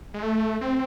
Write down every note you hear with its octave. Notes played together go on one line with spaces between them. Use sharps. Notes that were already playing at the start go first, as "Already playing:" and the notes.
G#3
A3
C4